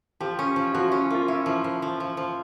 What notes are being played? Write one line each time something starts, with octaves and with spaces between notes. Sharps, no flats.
F3 G4
C#4
F3
F3 F#4
C#4 E4
A#3 F4
C#4 E4
F3
F3
F3
F3
F3